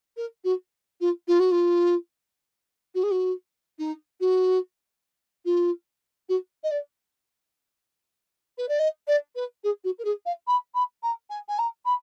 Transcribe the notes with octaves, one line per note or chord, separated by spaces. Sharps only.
A#4
F#4
F4
F4
F#4
F4
F#4
G#4
F#4
D#4
F#4
F4
F#4
D#5
D5
B4
D5
D#5
D5
B4
G#4
F#4
A#4
G#4
F5
B5
B5
A#5
G#5
G#5
A#5
B5